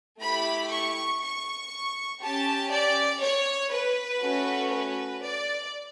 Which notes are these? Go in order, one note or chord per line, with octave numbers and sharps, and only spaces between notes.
A3 E4 G4 B5
C#6
C#6
C#4 G4 A5
D5
C#5
B4
A3 C#4 F#4 A4
B4
D5